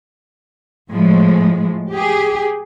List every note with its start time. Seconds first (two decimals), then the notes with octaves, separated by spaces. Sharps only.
0.90 A2 F3 G#3
1.91 G4 G#4